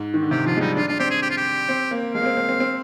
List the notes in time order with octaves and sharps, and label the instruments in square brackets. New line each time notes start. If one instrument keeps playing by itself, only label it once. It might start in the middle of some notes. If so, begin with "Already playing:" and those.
Already playing: [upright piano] G#2
D#3
D3
[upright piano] C3 [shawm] G4
[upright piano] F3 [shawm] F4
[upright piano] G#3
[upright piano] G3 [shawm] D#4
[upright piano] D4 [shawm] F4
[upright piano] D4 [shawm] F4
[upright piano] C4 [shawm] G4
[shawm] G#4
G4
F4
G4
[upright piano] C4
A#3
[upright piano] G#3 [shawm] F5
[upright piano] A#3
C4
C4
C4
C4